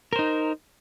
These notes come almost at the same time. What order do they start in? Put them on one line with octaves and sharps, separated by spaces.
A#4 C5 D#4